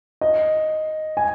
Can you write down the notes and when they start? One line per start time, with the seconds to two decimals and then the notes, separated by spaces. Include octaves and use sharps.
0.21 D#5
1.17 G#5